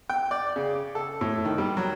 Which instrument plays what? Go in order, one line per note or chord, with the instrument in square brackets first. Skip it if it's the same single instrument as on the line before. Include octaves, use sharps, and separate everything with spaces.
[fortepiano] G5
D5
C#3
A4
A2
D#3
G3
F#3